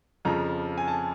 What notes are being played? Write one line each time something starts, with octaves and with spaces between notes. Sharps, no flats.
F2 C#3 F3 A#5
G#5
A5